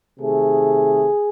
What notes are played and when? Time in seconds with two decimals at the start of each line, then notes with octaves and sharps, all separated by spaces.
0.19 C3 D#3 A3 G#4